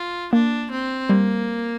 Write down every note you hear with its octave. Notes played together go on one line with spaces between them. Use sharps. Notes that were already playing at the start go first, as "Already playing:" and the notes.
Already playing: F4
A#3 D4
C4
G3 A#3